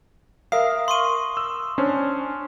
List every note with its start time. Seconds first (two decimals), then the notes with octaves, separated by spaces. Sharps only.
0.52 A#4 E5 F5 D#6 C7
0.88 C6 C#6 D#7
1.37 E6
1.78 C#4 D4 C5